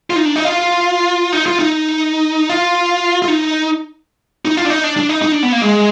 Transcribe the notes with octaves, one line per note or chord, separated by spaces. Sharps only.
F4
D#4
D4
D#4
F4
D#4
F4
D#4
F4
F4
D#4
D#4
F4
D4
D#4
D4
D4
D#4
D#4
D4
B3
A#3
G#3